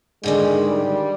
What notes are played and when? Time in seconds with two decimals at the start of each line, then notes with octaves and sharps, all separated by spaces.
0.23 G#2 D3 D#3 G#3
0.67 G3